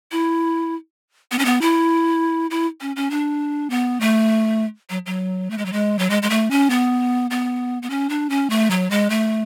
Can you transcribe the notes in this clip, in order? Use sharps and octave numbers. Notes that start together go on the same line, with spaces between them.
E4
B3
C#4
B3
E4
E4
C#4
C#4
D4
B3
A3
F#3
F#3
A3
G#3
F#3
G#3
F#3
G#3
G#3
A3
C#4
B3
B3
B3
C#4
D4
C#4
A3
F#3
G#3
A3